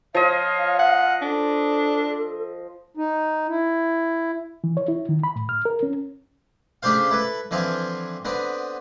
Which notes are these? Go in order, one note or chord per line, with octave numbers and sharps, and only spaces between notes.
F3 C#5 D#5 F5
F#5
D4 A4
D#4
E4
E3
C#5
E4
D#3
B5
A2
F6
A#4
C#4
C#3 A3 D4 G4 C5 F5
E4 A4 B4
D3 E3 F3 C4 F4
D3 B3 C4